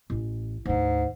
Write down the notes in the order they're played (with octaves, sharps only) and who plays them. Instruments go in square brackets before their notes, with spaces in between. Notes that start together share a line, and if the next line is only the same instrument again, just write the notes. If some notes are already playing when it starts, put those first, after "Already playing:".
[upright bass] A1
[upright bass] D2 D3 [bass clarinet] G#2